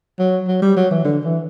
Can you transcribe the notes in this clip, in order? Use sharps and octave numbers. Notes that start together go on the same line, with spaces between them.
F#3
F#3
G3
F#3
E3
D3
E3